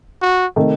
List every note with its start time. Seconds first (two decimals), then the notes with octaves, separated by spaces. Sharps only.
0.22 F#4
0.56 C3 D#3 A3